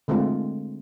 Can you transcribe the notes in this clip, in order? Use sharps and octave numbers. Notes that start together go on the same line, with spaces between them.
D3 G#3 A3 C4 F4